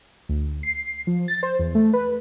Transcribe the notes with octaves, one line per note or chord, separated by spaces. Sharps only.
D2
C7
F3
A6
C5
E2
A3
B4